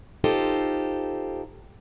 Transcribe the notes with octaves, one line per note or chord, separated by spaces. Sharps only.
D#4 F4 G4 A4 C5